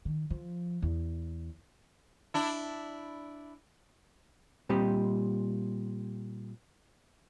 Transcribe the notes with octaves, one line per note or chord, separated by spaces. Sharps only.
D#3
F3
E2
D4 E4
A#2 G3 C4 G4 D#5